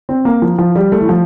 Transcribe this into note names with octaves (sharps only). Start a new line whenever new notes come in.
C4
A#3
F3
F3
G3
A3
E3
F3